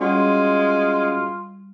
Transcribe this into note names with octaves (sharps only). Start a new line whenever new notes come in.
G3 G#3 C#4 F4 F#4 G#4